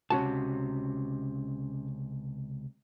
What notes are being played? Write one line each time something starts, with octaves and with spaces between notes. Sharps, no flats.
C#2 A2 C3 C#4 F#4 A5